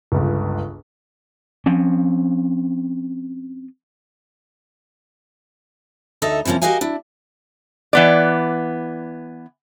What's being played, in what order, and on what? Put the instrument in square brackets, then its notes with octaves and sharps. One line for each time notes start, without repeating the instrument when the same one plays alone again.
[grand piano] G1 C#2
[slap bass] F3 C4 C#4
[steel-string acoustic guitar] D2 D#4 A4 D#5 E5
C3 E3 F3 A#3 C#4
F#4 G4 A#4 D#5 F5 G#5
D4 E4
[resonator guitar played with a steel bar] E3 B3 D5